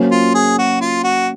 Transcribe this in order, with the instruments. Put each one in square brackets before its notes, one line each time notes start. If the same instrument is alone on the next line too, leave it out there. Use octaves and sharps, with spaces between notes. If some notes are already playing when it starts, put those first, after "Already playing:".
Already playing: [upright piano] F#3 A#3 C#4 F#4 C5
[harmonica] F4
G#4
F#4
F4
F#4